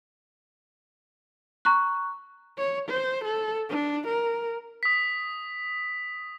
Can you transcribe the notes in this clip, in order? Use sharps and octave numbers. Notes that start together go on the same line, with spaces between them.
A#5 C#6 F#6
C#5
C5
A4
D4
A#4
D#6 B6